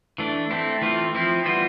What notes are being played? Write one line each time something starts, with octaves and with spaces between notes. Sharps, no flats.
E3 A3 D4
A3 C4 E4
E3 A3 C4 F4
F3 C4 E4
E3 G3 B3 F4 C5